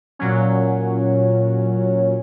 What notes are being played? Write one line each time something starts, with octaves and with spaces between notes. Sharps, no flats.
A#2 F#3 C#4